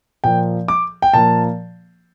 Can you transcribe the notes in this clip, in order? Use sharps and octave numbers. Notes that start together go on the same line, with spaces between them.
A#2 F3 A#3 G5
D6
G5
A#2 F3 A#3 A5